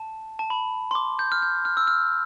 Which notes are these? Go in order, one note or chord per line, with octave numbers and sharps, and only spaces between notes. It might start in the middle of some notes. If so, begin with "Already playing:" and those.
Already playing: A5
A5
B5
C6
D6
G6
F6
G6
F6
E6
F6